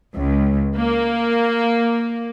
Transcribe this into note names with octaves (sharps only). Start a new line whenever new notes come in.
C#2
A#3